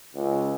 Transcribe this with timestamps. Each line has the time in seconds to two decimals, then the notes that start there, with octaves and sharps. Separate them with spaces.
0.15 C#2